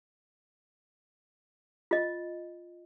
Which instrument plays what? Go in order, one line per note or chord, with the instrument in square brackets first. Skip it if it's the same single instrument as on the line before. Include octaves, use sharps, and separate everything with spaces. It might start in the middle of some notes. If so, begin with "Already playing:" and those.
[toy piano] F4 D#5